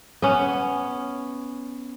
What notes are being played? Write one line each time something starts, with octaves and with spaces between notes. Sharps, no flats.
B3 C#4